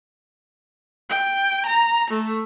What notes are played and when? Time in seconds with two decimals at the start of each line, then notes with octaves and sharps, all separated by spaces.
1.09 G5
1.66 A#5
2.10 A3